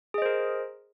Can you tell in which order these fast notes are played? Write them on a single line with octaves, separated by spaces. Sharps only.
G#4 D#5 C5 A#4